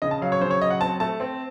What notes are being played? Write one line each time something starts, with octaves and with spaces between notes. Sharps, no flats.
C#3 D#5
A5
F#3 F5
C#5
C#3 C5
C#5
F#3 D#5
F#5
C4 A5
A3 A5
C4